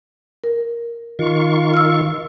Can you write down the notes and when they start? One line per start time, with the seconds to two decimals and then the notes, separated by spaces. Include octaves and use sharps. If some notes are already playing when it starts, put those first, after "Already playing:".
0.44 A#4
1.19 D#3 F4 C#6
1.74 E6 F6